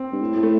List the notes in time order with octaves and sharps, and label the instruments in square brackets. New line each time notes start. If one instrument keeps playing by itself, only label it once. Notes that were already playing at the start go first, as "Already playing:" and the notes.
Already playing: [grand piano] C4
[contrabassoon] G2
A2
A2
[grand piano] A3